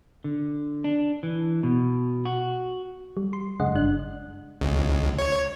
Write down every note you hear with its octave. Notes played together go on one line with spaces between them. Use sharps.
D3
D4
E3
B2
F#4
G3
C6
F#2 C#3 G#3 D#5 F#5
G1 G2 D4 F#6
C#2
C#5